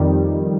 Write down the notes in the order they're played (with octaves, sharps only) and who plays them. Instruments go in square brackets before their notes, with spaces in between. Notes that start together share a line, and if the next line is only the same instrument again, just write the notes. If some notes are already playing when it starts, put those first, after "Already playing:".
Already playing: [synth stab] F2 D#3 G3